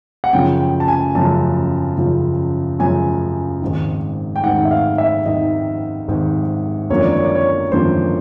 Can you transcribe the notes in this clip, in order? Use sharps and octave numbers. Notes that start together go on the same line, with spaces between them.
F#5
F#2 C#3 F3 G5
G5
A5
G#5
F#2 C#3 F3 A5
F#2 C#3 F3
F#2 C#3 F3 G#5
G#1 G#2 D#3
G5
G#1 G#2 D#3 F#5
E5
F5
E5
G#1 G#2 D#3 D#5
G#1 G#2 D#3
G#1 F#2 D3 F3 A#3 C#5
D5
C#5
D5
C#5
G#1 F#2 D3 F3 A#3 C5